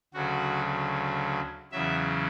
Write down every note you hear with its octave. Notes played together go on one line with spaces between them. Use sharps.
D2 C#3 F#3 F#4
E2 C#3 F#3 E5